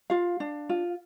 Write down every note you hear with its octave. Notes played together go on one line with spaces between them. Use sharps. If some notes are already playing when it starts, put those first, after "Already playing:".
F4 F5
D4
F4